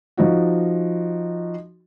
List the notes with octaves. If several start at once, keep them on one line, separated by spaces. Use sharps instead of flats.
F3 D#4 F#4